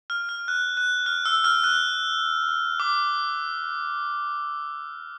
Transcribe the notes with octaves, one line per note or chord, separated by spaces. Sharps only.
F6
F6
F#6
F#6
F6
E6
F6
F#6
D6